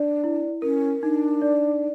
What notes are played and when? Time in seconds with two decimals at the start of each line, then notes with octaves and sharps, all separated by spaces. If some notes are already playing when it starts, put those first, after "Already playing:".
Already playing: D4 D5
0.24 E4
0.62 C#4 A#4
1.02 D4 D#4
1.42 D5